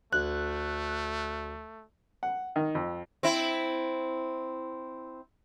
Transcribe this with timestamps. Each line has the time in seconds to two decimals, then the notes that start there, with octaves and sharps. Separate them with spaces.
0.13 D2 A3 F#6
2.23 F#5
2.56 D#3
2.75 F2
3.23 C4 E4